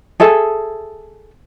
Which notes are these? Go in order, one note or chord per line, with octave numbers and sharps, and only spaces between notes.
G#4 A4 E5